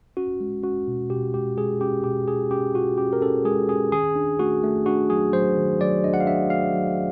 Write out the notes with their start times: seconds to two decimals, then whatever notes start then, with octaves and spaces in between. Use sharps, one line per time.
0.17 C#4 F#4
0.40 G#3
0.63 C#4 F#4
0.87 B2
1.10 B2 G4
1.34 G#3 G4
1.57 G#3 G#4
1.81 C#4 G4
2.04 B2 G4
2.27 C#4 G#4
2.51 C#4 G4
2.74 F4 F#4
2.98 C#4 G4
3.13 A#4
3.22 C#4 A4
3.45 G#3 G#4
3.69 C#4 G#4
3.92 D#3 G#4
4.16 D4
4.40 A3 F#4
4.63 A3
4.86 D4 F#4
5.10 F#3 G#4
5.33 F#3 C5
5.56 D#3
5.80 F#3 D5
6.04 D4 D#5
6.14 F#5
6.20 F5
6.27 D4 E5
6.50 A3 F5
6.74 F#3